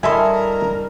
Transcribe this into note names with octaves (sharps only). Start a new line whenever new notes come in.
G2 E4 A4 A#4 D#5 E5 G#5 C6